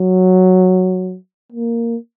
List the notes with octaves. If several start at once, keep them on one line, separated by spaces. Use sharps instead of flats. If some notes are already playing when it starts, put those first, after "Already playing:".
Already playing: F#3
A#3